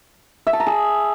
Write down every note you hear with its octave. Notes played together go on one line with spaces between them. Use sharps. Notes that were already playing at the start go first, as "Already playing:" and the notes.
E5
A5
A#5
G#4